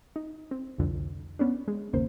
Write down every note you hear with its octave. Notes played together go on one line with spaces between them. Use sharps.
D#4
C4
C2 F2 D3
B3 C#4 D4
G#3
G1 D#2 C#3 A#3 C5